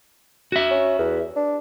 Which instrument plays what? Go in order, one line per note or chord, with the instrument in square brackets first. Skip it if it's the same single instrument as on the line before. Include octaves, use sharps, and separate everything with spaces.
[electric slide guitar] F#4 E5
[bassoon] C#4
E2
D4